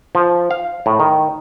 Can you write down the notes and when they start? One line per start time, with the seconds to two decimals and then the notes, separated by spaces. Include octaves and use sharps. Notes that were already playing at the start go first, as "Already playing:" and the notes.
0.15 F3
0.51 F5
0.86 A2
1.00 D#3